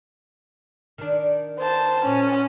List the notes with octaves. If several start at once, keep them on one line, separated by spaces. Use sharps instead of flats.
D#3 D4
C5 A5
A#2 C#4